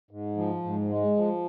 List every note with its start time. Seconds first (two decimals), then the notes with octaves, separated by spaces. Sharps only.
0.11 G#2
0.37 F3
0.63 G#2
0.89 G#3
1.16 F3